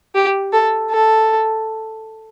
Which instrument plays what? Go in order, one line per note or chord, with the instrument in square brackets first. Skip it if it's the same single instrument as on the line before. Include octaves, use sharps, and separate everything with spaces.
[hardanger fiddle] G4
A4
A4